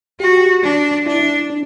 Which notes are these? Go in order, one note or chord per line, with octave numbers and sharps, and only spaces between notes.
F#4 G4
D4
D4 E4
D4